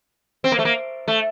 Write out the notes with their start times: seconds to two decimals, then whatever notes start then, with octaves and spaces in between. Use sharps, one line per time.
0.44 C4
0.52 A#3
0.59 A3
0.65 A#3
1.08 A3